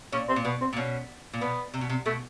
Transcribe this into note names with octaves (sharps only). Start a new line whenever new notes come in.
A#2 C#4
C4
A#2
B2 B3
C4
A#2
B2 C#4
A#2
B2 B3
C3
B2
C3
B2 A3